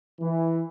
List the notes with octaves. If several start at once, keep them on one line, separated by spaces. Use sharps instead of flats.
E3